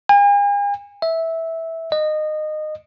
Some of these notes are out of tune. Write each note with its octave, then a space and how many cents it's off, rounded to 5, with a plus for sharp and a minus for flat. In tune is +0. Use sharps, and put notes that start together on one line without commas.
G#5 -45
E5 -15
D#5 -20